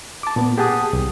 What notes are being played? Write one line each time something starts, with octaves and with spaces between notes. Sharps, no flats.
A5 D6
A#2 B3
G4 G#4 F#5 A5 D#6
C2